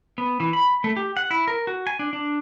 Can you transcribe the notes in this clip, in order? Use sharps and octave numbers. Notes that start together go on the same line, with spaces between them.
B3
E3
B5
A3
G4
F#5
E4
A#4
F#4
G#5
D4
D4